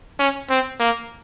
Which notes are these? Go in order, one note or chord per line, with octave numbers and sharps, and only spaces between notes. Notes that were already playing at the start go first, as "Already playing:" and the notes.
C#4
C4
A#3